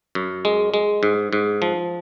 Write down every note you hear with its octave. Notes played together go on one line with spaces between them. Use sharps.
F#2
G#3
G#3
G#2
G#2
F3